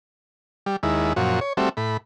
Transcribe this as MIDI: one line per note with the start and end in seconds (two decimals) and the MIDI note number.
0.66 0.76 55
0.83 1.13 39
0.83 1.13 56
0.83 1.13 64
1.16 1.40 42
1.16 1.40 46
1.16 1.40 53
1.16 1.40 66
1.41 1.53 73
1.57 1.69 55
1.57 1.69 57
1.57 1.69 60
1.57 1.69 66
1.57 1.69 76
1.77 1.97 45
1.77 1.97 83